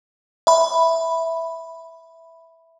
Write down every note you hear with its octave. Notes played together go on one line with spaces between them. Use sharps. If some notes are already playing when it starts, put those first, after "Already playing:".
E5 B5